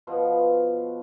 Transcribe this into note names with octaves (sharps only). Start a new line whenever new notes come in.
B2 F3 B3 F5